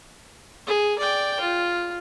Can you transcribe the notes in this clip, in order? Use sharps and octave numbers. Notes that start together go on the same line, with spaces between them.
G#4
D5 G5
F4